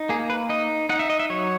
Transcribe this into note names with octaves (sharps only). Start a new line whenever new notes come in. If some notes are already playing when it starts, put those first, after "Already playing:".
Already playing: D#4
A#3 G#4
B4
D#4 D#5
D#4 F#5
E5
D#5
E5
F#3 C#5